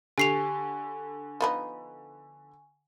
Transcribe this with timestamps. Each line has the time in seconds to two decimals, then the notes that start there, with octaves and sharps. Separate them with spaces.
0.18 D3 G4 G#5 C#6 C7 F7
1.41 F3 B3 D#4